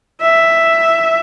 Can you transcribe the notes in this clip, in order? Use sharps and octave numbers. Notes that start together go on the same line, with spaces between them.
E5